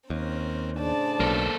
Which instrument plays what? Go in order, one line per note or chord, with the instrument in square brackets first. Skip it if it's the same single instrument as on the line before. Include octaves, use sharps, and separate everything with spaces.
[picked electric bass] D#2 [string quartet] C4 C#4 A#4
[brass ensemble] A2 C#3 D4 [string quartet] C5 D5 A5
[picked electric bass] B1 [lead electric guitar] A#3 A4